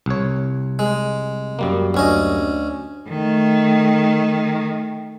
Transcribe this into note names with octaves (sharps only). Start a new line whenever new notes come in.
C2 C#5
G#3
F#2 G3 A#3
D2 C#4 D#5
D#3 A3